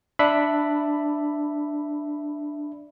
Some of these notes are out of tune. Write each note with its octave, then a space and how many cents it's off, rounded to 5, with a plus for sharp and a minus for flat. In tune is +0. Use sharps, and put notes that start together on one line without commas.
D4 +5 E5 +0 B5 +0